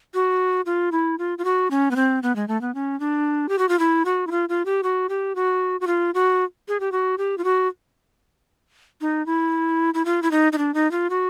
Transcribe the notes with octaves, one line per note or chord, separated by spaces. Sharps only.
F#4
F4
E4
F4
F4
F#4
C#4
B3
C4
B3
G#3
A3
B3
C#4
D4
G4
F#4
F4
E4
F#4
E4
F4
F4
G4
F#4
G4
F#4
F#4
F4
F#4
G#4
G4
F#4
G4
F4
F#4
D#4
E4
E4
F4
E4
D#4
D#4
D4
D#4
F4
F#4